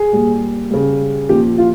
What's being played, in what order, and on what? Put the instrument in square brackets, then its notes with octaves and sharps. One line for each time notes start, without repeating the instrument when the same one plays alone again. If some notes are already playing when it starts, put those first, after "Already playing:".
Already playing: [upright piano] G#4
A#2 G3
C#3 G3
A#2 F3 G4
F4